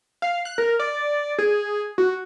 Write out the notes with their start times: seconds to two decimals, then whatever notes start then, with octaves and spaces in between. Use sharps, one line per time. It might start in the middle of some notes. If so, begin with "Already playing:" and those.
0.22 F5
0.45 F#6
0.58 A#4
0.79 D5
1.38 G#4
1.98 F#4